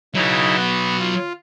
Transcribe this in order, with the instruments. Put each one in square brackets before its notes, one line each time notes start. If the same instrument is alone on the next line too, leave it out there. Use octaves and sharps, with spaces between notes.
[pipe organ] C#3 D#4 E4 [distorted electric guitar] F#3 B4
[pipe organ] B3 F#4
F4